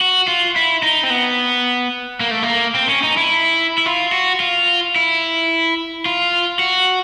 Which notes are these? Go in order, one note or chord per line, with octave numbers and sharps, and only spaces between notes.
F#4
F4
E4
D#4
C4
B3
A#3
A3
A#3
C4
C#4
D#4
E4
E4
F4
F#4
F4
E4
F4
F#4